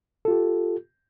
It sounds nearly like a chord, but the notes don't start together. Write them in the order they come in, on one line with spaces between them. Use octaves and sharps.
A4 F4 G4